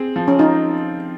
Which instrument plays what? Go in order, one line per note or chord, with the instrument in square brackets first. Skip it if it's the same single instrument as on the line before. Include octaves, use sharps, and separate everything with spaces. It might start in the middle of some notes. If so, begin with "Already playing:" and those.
Already playing: [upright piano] C4 G#4
F3
[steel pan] C#4
[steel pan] D#4 [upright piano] F4